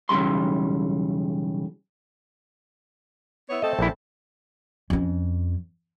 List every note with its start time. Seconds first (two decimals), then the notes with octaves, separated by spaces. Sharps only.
0.09 B1 E2 G#2 C#3 G3 C6
3.50 B3 E4 C#5
3.62 A3 C4 A4 D#5
3.79 A#1 E4
4.90 F2 C#4